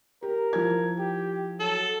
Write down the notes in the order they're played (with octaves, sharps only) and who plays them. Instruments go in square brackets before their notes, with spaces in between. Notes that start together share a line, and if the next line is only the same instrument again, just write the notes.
[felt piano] G4 [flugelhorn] A#4
[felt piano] F3 E4 G#6
[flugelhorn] G4
[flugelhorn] F#3 [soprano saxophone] A4